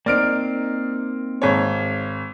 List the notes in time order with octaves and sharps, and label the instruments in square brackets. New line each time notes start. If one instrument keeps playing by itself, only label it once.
[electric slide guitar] A#3 C4 D#4 [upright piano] D5 F6 D7
[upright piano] G#1 C#5